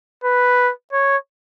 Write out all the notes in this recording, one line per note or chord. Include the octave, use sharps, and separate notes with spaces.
B4
C#5